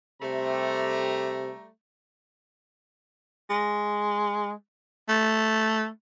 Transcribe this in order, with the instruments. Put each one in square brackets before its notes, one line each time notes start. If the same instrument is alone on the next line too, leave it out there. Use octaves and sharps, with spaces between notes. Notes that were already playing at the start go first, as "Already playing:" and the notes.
[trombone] C3 [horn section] G3 A3 A#5
[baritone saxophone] G#3
A3